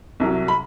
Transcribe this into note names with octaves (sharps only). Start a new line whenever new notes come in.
C2 C3 F#3
B5